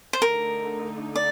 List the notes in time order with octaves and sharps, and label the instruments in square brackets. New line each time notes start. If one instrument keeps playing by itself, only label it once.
[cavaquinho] C5
[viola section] D3 A3 D#4 [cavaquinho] A#4
[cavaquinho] D5